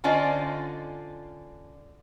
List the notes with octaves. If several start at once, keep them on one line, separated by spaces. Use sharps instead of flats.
D3 C#4 F4 C5 D5 D#5